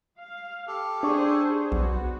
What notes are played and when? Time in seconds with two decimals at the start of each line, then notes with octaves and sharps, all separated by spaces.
0.20 F5
0.67 G4 A4
1.03 D4 G#4 C5 D5 C#6
1.72 B1 B3 F#4